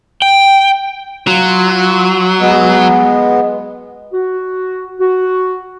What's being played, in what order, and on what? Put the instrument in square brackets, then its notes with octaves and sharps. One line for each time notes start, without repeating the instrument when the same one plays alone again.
[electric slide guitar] G5
[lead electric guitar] F#3 [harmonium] F4
[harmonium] G#3 B3
[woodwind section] F#4
F#4